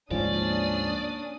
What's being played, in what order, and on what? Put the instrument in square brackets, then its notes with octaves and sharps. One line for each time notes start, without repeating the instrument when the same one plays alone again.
[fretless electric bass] D2 G#2 F3 [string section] A#3 D4 D#6 [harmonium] C#4 [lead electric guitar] D5